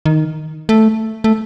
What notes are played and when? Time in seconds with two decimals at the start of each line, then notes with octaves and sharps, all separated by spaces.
0.06 D#3
0.69 A3
1.24 A3